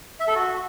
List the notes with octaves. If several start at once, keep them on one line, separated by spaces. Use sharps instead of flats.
E5
A4
F#4